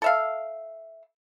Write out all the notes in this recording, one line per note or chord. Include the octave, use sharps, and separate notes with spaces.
A4 E5 F5